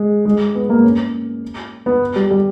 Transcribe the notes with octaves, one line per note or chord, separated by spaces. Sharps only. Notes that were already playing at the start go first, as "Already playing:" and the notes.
Already playing: G#3
G#3
B3
A#3
C#4
B3
G3
G3